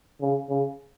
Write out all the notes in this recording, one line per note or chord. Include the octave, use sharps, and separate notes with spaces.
C#3
C#3